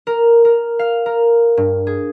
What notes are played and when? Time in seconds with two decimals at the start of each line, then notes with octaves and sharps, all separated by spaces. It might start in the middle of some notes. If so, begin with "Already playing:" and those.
0.07 A#4
0.45 A#4
0.79 F5
1.06 A#4
1.57 G2
1.87 G#4